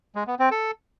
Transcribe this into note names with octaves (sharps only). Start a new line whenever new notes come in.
G#3
B3
C4
A4